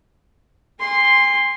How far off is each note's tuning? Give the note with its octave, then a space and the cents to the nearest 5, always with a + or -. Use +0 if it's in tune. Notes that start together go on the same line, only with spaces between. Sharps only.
G#5 -40 C6 +0